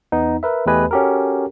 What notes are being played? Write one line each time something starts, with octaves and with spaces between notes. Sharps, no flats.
E2 B3 D#4
A#4 B4 E5
E2 A3 G4 B4 D#5 G#5
C#4 F#4 G4 A4 A#4